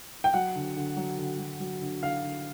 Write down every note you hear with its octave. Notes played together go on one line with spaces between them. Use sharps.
G5
F#3 F#5
D3
D3
F#3
D3
F#3
F#3
D3
D3 F5
D3